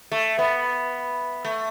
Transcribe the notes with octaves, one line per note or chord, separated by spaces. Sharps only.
A3
B3
A3